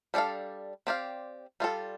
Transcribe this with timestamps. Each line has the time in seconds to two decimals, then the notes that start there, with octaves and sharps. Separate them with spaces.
0.14 G3 D4 A4 F5
0.87 C4 G4 D5 F5
1.60 G3 F4 A4